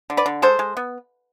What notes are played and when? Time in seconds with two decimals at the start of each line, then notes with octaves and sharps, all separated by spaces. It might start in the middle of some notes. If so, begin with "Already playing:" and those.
0.10 D3
0.17 B4 D5
0.26 D3
0.42 G#3 A4 C5
0.59 G#3
0.77 B3